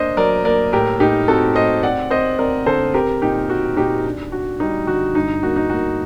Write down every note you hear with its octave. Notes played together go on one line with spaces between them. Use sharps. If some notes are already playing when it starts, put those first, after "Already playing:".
Already playing: A#3 D4 C5 D#5
F#3 A#4 D5
A#3 A#4 D5
A2 G4 A#4
A2 D#4 G4
C4 F#4 A4
A2 C5 D#5
C4 D5 F#5
C4 C5 D#5
C4 A#4 D5
D3 A4 C5
C4 G4 A#4
A#2 D#4 G4
C4 F#4
A#2 D#4 G4
D4
D4 F#4
G3 D#4
D3 F#4
G2 D#4
A#3 F#4
D#4
A#3 F#4